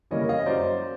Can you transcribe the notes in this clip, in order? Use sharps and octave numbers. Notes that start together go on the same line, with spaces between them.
C#3 E3 G3 A#3 C#5 D#5
D#5 F5
F#2 C5 D5